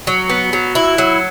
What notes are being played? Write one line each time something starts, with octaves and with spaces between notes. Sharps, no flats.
F#3
B3
F#3
E4
F#3